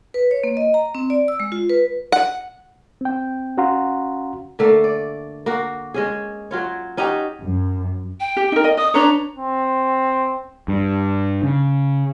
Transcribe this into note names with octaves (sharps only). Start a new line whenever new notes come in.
B4
C#5
A#3
D#5
A#5
C4
D5
E6
G#3
F4
B4
F#5
C4 G5
C#4 F#4 F5 F#5 A#5 C6
D3 A3 A#3
D5
A#3 F#4
G#3 C#4 G#4
F#3 F4 C#5
C#4 D#4 F#4 G4
F#2
G5
G4
D#4 A#4
D#5
D#5 D#6
D4 B4 C#5 A#5
C4
G2
C#3